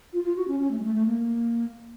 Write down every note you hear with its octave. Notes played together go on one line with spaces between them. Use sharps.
F4
F4
F#4
C#4
C#4
A3
G#3
A3
A3
A#3